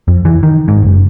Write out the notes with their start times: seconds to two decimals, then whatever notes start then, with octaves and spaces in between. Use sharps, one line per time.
0.08 F2
0.25 E3
0.43 D#3
0.68 G#2
0.83 F#1